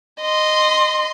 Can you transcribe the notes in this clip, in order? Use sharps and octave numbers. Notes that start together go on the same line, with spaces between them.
D#5 C6